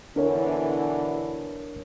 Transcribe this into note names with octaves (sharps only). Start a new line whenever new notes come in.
B2 D3 E3 D4 A#4 C#5